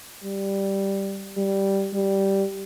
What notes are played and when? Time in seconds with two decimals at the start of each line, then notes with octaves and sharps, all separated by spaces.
0.24 G3
1.37 G3
1.93 G3